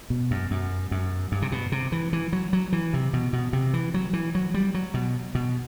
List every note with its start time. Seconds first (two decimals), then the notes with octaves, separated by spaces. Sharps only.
0.10 B2
0.31 F#2
0.51 F#2
0.91 F#2
1.32 G2
1.42 C3
1.52 B2
1.72 C3
1.92 E3
2.13 E3
2.33 F#3
2.53 F#3
2.72 E3
2.94 C3
3.13 B2
3.33 B2
3.53 C3
3.74 E3
3.94 F#3
4.13 E3
4.35 F#3
4.54 G3
4.74 F#3
4.94 B2
5.35 B2